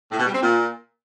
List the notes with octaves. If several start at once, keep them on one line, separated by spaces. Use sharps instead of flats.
A2
B2
G3
C4
A#2